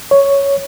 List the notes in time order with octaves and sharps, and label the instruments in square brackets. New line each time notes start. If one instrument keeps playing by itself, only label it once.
[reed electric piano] C#5